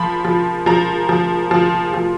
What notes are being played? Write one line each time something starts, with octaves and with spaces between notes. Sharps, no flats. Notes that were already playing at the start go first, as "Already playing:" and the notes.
Already playing: F3 B5
F3
F3 A#5
F3
F3
F3